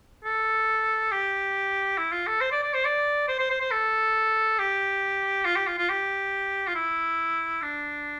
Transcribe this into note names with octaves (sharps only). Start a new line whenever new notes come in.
A4
G4
E4
F4
A4
C5
D5
D5
C5
D5
C5
C5
C5
C5
A4
G4
F4
G4
F4
F4
G4
F4
E4
D4